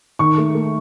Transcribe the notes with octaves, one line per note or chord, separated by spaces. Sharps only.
D#3 C#6
A3
A3